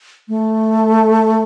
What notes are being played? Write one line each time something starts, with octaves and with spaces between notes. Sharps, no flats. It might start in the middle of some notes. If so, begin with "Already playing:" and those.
A3